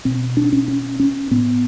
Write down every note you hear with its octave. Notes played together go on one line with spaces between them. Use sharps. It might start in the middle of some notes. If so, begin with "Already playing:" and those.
B2 C4
D4
C#4
C#4
C#4
A2 B3